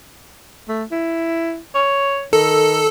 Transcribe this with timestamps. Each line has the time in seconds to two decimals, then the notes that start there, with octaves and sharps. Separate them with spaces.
0.68 A3
0.91 E4
1.75 C#5
2.33 D#3 A4